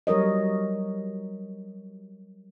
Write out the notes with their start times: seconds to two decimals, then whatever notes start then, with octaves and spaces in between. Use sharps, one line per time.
0.07 F#3 G3 A#4 C#5 D#5